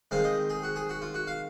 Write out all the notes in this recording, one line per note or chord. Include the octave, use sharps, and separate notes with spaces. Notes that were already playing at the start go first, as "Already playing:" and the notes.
D#3 G#3 C4 F5
D#5
G#4
F#4
G#4
F#4
F4
F#4
F5